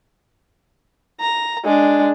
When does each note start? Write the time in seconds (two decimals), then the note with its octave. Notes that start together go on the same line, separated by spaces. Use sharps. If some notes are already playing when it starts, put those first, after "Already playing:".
1.20 A#5
1.64 G#3 D4